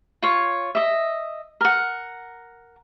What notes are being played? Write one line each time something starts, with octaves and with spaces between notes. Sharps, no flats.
F4 C#5
D#5 E5
A#4 F#5